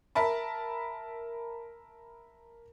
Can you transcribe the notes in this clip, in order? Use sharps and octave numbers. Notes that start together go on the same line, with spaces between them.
A#4 E5 A5 B5